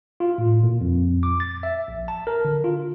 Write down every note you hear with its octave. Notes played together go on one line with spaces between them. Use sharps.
F4
A2
A#2
F2
D6
A6
E5
A#1
A5
A#4
D3
F4